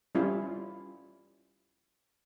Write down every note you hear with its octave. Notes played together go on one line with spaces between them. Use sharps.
G3 C#4 E4 F4